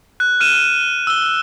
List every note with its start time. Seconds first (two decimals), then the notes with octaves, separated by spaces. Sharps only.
0.20 F#6
0.40 F6 D#7 E7
1.07 E6 G7